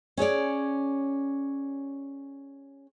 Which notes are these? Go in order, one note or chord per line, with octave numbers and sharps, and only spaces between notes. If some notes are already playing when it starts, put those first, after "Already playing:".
C#4 G#4 C#5 D5